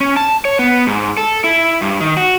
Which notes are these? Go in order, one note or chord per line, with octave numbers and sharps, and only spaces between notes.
C#4
A5
C#5
B3
G#2
A4
E4
G2
D#3
F#4